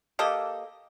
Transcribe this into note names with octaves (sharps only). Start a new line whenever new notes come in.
A#3 G4 A4 D#5